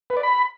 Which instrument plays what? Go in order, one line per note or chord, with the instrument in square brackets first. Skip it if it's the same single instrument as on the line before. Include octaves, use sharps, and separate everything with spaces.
[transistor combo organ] B4
D5
B5